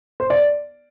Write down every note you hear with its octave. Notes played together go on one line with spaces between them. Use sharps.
C5
D5